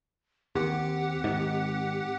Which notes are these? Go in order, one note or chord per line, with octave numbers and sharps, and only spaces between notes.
D#2 C4 G4 F#5
G#2 D#3